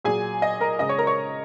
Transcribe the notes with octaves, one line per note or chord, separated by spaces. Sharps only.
A#2 F#3 G#4 G#5
D#5 D#6
A#4 A#5
C#3 G#3 D#5 D#6
C#5 C#6
A#4 A#5
C#5 C#6